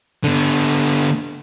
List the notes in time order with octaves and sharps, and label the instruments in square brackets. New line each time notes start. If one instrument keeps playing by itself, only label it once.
[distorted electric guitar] D3 B3